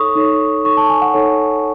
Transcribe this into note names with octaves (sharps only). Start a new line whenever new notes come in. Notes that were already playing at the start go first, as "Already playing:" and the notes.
Already playing: D#4 A4 C#5 C#6 D#6
D#4 A4 C#5
D#4 A4 C#5 C#6
A5
G#5
F#5
D#4 A4 C#5